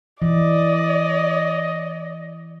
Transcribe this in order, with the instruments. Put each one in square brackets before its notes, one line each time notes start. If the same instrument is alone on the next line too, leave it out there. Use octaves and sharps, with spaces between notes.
[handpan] E3 [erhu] D5 [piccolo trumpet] D#5